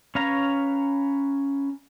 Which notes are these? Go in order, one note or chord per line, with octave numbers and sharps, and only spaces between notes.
C#4 B4 C#5 F5 A#5